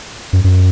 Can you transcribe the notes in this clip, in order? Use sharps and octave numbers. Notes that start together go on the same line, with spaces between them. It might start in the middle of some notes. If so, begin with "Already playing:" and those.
F#2
F#2